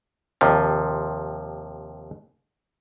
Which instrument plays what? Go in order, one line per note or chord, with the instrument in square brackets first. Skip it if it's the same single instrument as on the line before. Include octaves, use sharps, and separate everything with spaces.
[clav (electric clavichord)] D#2 C3 F3